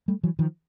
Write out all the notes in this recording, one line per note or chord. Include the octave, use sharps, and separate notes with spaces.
G3 A3
E3 F#3
D#3 F3